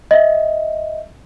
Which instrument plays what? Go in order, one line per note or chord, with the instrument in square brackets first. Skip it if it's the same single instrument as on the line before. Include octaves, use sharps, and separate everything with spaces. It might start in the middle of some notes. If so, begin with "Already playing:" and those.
[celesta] D#5 E5